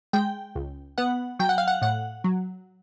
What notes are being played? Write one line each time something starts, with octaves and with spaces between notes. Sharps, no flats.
G#3 G5
C#2
B3 F#5
F#3 G5
F#5
F5
F#5
A2 F#5
F#3